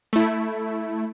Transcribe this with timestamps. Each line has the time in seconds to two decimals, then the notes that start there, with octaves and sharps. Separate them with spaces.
0.13 A3 E4